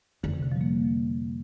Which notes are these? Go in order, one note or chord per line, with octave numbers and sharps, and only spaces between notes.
F2 D3
C3
D3
F3
G3
A#3